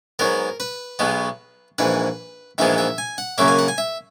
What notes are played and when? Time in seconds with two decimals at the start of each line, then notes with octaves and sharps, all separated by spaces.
0.19 G#2 F#3 B3 A#4
0.60 B4
0.99 B1 B2 G#3 B3
1.78 A#1 G#2 E3 B4
2.58 A#1 G#2 E3 G#3 B3 E5
2.78 E5
2.98 G#5
3.18 F#5
3.38 F#2 C#3 F#3 A#3 E5
3.48 G#5
3.59 F#5
3.68 G#5
3.78 E5